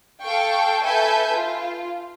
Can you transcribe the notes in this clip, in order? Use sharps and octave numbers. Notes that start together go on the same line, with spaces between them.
A4 F5 G5 C#6
A4 B4 E5 G#5 G6
F4